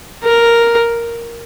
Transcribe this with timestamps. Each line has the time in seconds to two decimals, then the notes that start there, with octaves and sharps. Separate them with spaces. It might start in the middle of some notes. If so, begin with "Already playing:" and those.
0.24 A#4